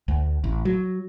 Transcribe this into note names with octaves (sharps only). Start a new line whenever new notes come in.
D2
A1
F#3